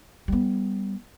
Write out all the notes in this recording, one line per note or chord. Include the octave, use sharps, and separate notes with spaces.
G3 B3